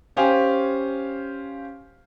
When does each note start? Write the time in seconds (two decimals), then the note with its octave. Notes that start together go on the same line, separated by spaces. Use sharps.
0.16 C#4 G4 C5 F5 G#5